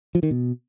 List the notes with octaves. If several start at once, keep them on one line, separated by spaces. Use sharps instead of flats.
F3
D#3
B2